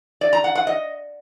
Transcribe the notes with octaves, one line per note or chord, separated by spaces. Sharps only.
D5
A#5
F#5
F#5
D#5